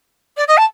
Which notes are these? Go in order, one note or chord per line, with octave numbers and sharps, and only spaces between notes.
D5
D#5
A5